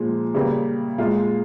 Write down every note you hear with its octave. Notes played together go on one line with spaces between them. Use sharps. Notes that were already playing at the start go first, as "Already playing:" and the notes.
Already playing: A#2 F3 G#3
C#3 G3 A#3
A#2 G#3 F4